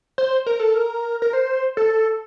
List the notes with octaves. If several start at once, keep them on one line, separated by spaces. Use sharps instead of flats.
C5
A#4
A4
A#4
A#4
C5
A4